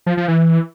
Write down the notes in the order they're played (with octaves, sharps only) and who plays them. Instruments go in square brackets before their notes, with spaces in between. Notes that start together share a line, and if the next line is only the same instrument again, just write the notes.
[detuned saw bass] F3
F3
E3